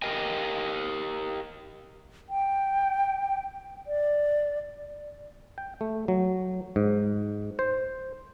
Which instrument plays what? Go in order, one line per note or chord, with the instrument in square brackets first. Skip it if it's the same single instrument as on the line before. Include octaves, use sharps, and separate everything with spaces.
[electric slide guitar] G4 A#4 D#5 G5 G#5
[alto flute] G5
D5
[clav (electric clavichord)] G5
A3
F#3
G#2
C5